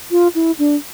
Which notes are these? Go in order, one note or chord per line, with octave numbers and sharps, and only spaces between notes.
F4
E4
D4